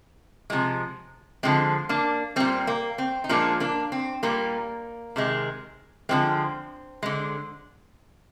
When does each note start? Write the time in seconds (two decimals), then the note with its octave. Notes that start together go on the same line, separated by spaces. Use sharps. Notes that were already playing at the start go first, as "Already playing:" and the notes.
0.50 C3 F3 G#3
1.43 D3 F3 G#3 C4
1.89 A#3 D4
2.36 A#2 G3 C4
2.67 A#3
2.98 C4
3.24 D#4
3.29 A#2 F3 G#3 A#3 D4
3.60 A#3 D4
3.92 C4
4.23 A#2 G3 A#3
5.16 C3 D#3 G#3
6.09 D3 F3 G#3 C4
7.03 D3 G#3